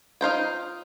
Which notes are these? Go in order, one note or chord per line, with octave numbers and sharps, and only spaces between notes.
D#4 F4 C5 G5